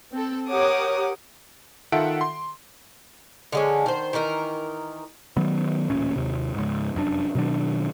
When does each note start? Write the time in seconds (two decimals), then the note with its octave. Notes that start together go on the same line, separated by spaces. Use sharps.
0.13 C4 A4
0.49 G4 A#4 C#5 F#5 D6 D#6
1.92 D#3 F4 A4 E5 F#5 D7
2.21 C6
3.52 D3 G#3 C#4
3.86 D#3 C5
4.13 D#3 E3 D#4 A#4
5.37 D#3 F#3 B3
5.90 D1 A1 A#2 C#4
6.16 D#2 C3
6.54 C#2 G#2
6.95 F1 F#2 C#3 D4
7.35 B2 D#3 F#3 D4